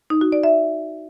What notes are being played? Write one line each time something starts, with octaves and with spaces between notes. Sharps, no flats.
D#4
F#4
D5
E5